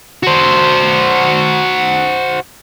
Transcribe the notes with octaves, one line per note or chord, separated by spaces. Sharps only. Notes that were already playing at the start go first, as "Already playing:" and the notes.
F#4 C5